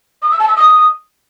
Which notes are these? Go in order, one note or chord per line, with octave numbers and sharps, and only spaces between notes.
D#6
E6
A5
E6
D#6